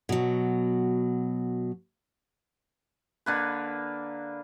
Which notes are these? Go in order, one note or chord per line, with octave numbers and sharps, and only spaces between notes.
B2 F#3
D3 A#3 B4